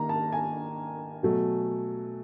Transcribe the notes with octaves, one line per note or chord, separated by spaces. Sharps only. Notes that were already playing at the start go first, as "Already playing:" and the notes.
Already playing: D#3 A#3 A#5
A5
G#5
B2 F#3 A3